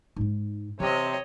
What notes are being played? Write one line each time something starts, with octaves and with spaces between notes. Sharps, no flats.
G#2 D#4
C3 E3 C#5 D#5